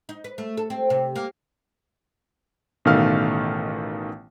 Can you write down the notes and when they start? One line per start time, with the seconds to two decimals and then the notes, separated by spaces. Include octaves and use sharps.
0.09 D#4
0.24 B4
0.38 A3
0.57 A4
0.70 C4
0.90 C3
1.15 A#3
2.85 A1 B2 D#3 A3 F5 F6